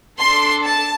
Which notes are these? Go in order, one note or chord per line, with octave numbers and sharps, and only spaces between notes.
D4 A4 C6
A5